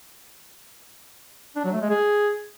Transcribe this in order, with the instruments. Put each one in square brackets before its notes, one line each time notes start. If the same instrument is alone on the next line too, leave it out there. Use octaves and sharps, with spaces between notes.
[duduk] D4
F#3
A3
G#3
G#4